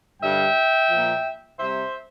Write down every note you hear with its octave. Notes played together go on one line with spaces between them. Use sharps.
G2 D3 G3 E5 G5
A#2 F3
C3 G3 C5 E5